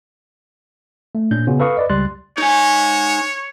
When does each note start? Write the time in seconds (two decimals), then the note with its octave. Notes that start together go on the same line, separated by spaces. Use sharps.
1.15 A3
1.31 A#2 C#4 D4 G6
1.47 C#3 B3 C#4 F4 F#4
1.60 A4 B4 F5 C#6 D#6
1.77 B4 D5 D#5
1.89 C#2 G3 C6 F#6 A6
2.38 D#4 C#5 G#5